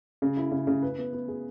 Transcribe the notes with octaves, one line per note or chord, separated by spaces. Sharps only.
C#3
E4
C#3
C#3
B4
B3
B3
G#4